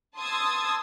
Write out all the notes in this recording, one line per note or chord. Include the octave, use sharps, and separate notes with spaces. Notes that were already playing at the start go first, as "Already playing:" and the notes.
A5 C6 D#6 E6 G#6 A6